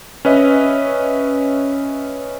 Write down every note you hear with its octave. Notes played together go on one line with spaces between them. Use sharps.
C#4 B4 D#5 E5